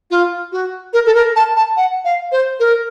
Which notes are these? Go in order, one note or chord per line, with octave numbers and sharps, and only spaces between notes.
F4
F#4
A#4
A4
A#4
A5
A5
F#5
F5
C5
A#4